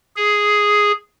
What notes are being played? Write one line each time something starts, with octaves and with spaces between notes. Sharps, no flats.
G#4